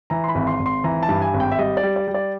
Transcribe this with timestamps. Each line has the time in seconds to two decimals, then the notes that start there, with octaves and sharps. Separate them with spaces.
0.10 E3 A#5
0.24 C6
0.28 B5
0.35 G#1
0.47 C6
0.60 G#1
0.66 C6
0.84 E3 A#5
1.03 A5
1.09 G2
1.22 G#5
1.34 G#1
1.40 G5
1.52 E5
1.59 G3 D#5
1.77 D5
1.83 G3
1.96 D5
2.08 G3
2.14 D5